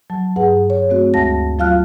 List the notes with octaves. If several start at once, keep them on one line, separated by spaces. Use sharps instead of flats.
F#3 A5
G2 G#4 B4 F#5
C#5
A3 C4 F#4
D2 G#3 E5 A5 A#6
F#3 F4 F5 A5 F6 F#6